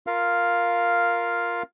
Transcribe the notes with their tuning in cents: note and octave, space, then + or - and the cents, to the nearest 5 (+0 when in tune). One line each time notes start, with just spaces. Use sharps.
F4 +0 A#4 +0 F5 +0